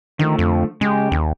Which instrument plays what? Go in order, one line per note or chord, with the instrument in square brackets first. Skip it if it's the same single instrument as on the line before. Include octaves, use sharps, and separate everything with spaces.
[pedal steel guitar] D3 F3 A3 [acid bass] D#3
[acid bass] F2
[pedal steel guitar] C#3 G4 [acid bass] G#3
[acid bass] D#2